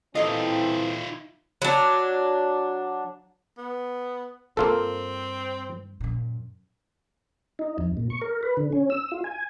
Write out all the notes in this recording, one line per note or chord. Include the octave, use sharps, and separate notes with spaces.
A#2 E3 C4 D#4 F4 A4 D#5
F#3 D4
B3
G2 A#3 C4 F4 A4
F#2 A#2
D#4
F2
A#2
C#6
A#4
B4
D3
C#4
E6
F4
G#5